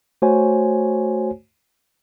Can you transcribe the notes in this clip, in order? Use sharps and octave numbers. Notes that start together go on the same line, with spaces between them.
A3 F#4 C5 C#5 G#5